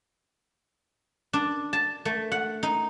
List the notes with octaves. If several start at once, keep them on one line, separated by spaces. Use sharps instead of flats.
D4
A5
A3
F#5
D#4